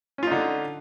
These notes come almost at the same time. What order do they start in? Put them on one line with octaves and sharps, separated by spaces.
C#4 F4 D#4 D3